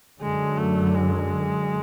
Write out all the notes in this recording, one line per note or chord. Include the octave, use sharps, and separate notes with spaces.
F#2 D3 F#3 G#3
A3
G#3